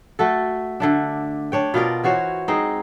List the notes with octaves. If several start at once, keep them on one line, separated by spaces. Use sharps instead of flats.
A3 F#4 A4
D3 A3 D4
D4 C#5 G5
B2 F4 A#4 D5
E3 F#4 C5 C#5
G#3 C4 D#4